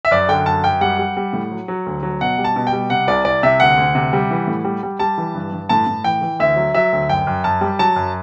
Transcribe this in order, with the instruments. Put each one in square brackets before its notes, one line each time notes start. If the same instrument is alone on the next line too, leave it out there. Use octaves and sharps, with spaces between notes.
[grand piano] E5
F#2 D5
D3 G5
F#2 A5
F#2 G5
G3 F#5
G3
G3
A2
F#3
F#3
D2
F#3
B2 F#5
G3
A5
B2
G5
G3
C3 F#5
C2 D5
C2 D5
C3 E5
D2 F#5
D2
C3
G3
E3
A2
G3
G3
G3 A5
E3
G2
G2
A2 A5
A2
E3 G5
E3
D2 E5
F#3
F#3 E5
D2
F#2 G5
F#2
F#2 A5
G3
F#3 A5
F#2